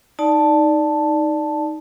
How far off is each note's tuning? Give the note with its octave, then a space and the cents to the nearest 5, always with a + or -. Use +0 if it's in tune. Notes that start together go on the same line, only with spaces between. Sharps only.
D#4 +0 D5 +0 A5 +0